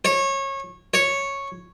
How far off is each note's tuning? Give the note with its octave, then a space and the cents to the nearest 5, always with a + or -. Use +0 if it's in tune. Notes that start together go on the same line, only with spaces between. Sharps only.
C#5 -25
C#5 -5